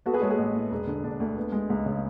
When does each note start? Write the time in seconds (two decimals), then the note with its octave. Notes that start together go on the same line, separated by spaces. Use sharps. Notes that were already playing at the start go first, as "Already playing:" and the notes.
0.06 B3 F#4 A4
0.13 G#4 B4
0.22 G#3 A4 C#5
0.30 G#4 B4
0.38 A1
0.55 A2
0.71 E1
0.87 D3
1.04 E1 D4
1.20 D2
1.37 B3
1.52 G#3
1.70 C#2
1.86 C#3